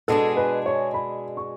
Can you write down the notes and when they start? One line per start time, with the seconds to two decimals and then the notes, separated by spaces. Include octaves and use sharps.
0.08 B2 G#3 D4 G#4 A4
0.37 B4
0.66 C#5
0.94 B5
1.37 C#6